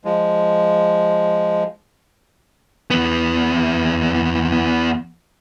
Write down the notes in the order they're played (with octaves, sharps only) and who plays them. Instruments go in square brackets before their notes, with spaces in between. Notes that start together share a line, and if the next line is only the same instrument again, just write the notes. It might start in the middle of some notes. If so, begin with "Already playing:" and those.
[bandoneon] F3 G#3
[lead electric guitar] E2 B3